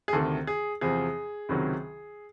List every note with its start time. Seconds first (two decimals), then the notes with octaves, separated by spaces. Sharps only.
0.08 G#4
0.13 D2 C3 D#3 A4
0.47 G#4
0.81 E2 C3 F3 G#4
1.49 C#2 C3 D#3 F#3